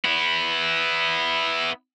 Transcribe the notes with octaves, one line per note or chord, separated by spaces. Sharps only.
B3 E4